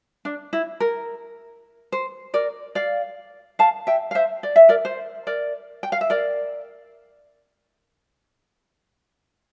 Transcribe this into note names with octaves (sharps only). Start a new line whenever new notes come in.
D4
E4
A#4
C5
A#4 D5
D5 F5
F5 A5
E5 G5
F5
C5 E5
D5
E5
A#4 D5
C5
A#4 D5
G5
F5
E5
A#4 D5